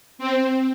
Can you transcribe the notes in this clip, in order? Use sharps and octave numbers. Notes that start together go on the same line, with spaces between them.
C4